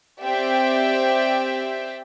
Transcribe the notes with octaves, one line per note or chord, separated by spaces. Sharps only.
C4 G4 D5 E5 G5